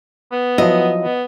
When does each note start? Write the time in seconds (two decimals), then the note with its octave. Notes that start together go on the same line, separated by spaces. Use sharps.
0.32 B3
0.58 F3 F#3 E4 D#5
1.03 B3